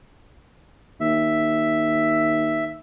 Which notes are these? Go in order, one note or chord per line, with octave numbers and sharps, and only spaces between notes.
D#2 E5